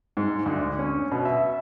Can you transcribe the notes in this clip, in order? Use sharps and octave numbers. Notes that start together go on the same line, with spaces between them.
G#2
D2
C#4
B2
E5